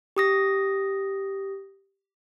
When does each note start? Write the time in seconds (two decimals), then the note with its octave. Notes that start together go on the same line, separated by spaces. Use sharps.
0.16 G4 D#6 A#6